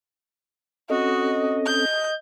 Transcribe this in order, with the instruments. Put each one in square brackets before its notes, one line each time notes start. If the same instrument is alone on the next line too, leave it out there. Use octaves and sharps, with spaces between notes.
[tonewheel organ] C4 C#4 A4 [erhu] F#4 [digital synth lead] D#5
[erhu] G6